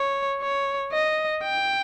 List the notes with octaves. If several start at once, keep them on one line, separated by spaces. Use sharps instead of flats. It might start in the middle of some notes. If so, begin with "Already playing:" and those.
Already playing: C#5
C#5
D#5
G5